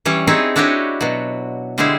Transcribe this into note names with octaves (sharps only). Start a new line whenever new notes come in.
E3 G3 C#4 C#5
C4 D#4 E4 G#4 C#5
D4 E4 F#4 G4 C#5 D#5
B2 F#3
D3 G3 G#3 E4 G#4 C5